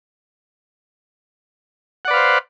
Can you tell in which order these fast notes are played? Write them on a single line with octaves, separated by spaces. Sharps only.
F#5 D5 B4 F5 C5